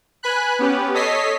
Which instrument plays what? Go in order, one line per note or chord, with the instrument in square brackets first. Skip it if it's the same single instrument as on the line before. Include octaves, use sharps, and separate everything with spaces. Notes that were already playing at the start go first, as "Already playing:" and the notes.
[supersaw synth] B4 G#5 B5 F#6
B3 C#4 G4 B4
A4 C#5 D#5 D#6 B6 C7